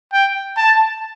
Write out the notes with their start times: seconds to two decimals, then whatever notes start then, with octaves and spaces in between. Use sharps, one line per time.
0.13 G5
0.57 A5